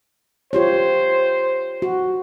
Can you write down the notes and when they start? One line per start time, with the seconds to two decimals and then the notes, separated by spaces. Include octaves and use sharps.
0.53 F4 G4 C5 C#5
1.82 F#4